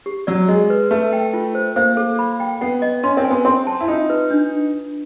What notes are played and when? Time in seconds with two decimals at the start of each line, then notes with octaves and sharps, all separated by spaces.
0.06 G4
0.27 F#3 D5
0.48 G#3 D#5
0.70 B4
0.91 A3 B4
1.13 G5
1.34 F4
1.55 C5
1.76 A#3 C5
1.97 A4
2.19 B5
2.40 G5
2.61 B3 F#5
2.82 D#5
3.03 C#4 C6
3.17 C4
3.25 G#5
3.30 B3
3.45 C4 C6
3.67 A5
3.80 E4
3.88 D#4 F4
4.10 B4
4.31 D4